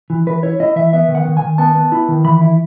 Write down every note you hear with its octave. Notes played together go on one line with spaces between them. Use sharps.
E3
E3 B4
E4 C#5
E4 D#5
E3 E5
B3 E5
D#3
F#5
D#3
D#3 G#5
B3 A5
B3
E4
D#3
E3 B5
E4